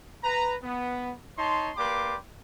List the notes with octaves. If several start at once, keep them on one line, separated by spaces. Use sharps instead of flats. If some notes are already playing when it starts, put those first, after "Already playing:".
B4 A#5
B3
D#4 C#5 A5 C6
A#3 G4 B4 D5 C6 D6